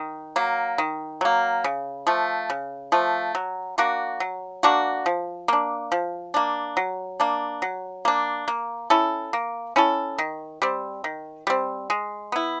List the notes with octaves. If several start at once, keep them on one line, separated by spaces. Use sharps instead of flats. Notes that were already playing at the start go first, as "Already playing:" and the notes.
Already playing: D#3
F#3 A#3
D#3
F#3 A#3
C#3
F3 A3
C#3
F3 A3
F#3
A#3 D4 F#4
F#3
A#3 D4 F#4
F3
A#3 D4
F3
A#3 D4
F#3
A#3 D4
F#3
A#3 D4
A#3
C#4 E4 A4
A#3
C#4 E4 A4
D#3
G3 C4
D#3
G3 C4
G#3
B3 E4